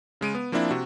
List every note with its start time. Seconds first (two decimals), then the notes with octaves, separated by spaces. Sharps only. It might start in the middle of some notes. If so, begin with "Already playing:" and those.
0.21 C#3 G#3 D7 D#7
0.35 B3
0.52 F3 A#3 C4 D4 E4
0.71 C3 F#4